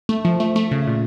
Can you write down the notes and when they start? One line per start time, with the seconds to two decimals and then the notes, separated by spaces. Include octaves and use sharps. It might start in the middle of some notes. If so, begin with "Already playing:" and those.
0.09 A3
0.25 F3
0.40 A3
0.56 A3
0.71 C#3
0.87 A#2